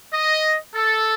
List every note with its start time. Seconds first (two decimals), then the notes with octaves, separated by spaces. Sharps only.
0.13 D#5
0.75 A4